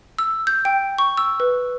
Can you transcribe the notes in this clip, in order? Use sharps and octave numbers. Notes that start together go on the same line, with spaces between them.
E6
G6
G5
C#6
E6
B4